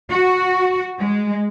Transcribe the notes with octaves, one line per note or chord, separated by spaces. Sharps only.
F#4
G#3